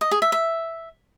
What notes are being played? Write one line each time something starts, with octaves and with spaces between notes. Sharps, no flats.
D#5
G#4
E5
E5